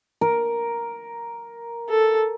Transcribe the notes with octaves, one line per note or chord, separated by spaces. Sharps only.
A#4
A4